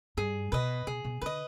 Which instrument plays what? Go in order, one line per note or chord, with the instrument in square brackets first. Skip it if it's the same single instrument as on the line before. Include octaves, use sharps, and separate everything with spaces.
[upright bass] G2 [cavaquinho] G#4
[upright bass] B2 [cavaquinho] B4 D#5
[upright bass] B2 [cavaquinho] G#4
[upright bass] B2
[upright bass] D3 [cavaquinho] B4 D#5